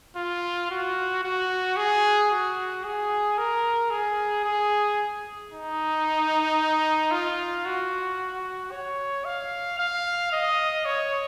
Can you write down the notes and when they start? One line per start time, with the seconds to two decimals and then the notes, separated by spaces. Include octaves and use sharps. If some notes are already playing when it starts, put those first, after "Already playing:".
0.16 F4
0.71 F#4
1.24 F#4
1.77 G#4
2.31 F#4
2.84 G#4
3.38 A#4
3.90 G#4
4.44 G#4
5.52 D#4
7.11 F4
7.65 F#4
8.71 C#5
9.25 F5
9.78 F5
10.32 D#5
10.85 C#5